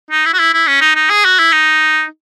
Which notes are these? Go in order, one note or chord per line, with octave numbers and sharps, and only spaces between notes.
D#4
E4
F#4
E4
E4
C#4
D#4
D#4
G#4
F#4
E4
D#4